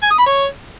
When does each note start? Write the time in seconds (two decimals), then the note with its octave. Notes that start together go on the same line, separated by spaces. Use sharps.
0.03 G#5
0.11 D#6
0.19 B5
0.26 C#5